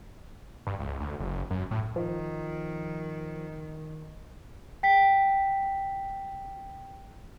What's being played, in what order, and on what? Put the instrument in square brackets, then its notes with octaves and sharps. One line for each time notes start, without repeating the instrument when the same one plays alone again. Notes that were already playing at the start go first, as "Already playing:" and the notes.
[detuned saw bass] G2
C#2
D2
F#1
F#2
A2
[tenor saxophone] D#3 [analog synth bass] F3
[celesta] G5 B6